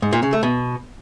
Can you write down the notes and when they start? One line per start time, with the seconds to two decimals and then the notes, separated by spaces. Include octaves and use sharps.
0.02 G#2
0.13 A#2
0.23 C#3
0.33 A3
0.43 B2